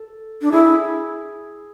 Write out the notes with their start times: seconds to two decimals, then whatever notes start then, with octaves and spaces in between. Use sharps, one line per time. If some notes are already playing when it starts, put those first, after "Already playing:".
Already playing: A4
0.42 D4
0.52 E4 G#4